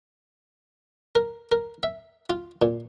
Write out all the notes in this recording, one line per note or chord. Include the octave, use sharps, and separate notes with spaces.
A#4
A#4
E5
F4
A#2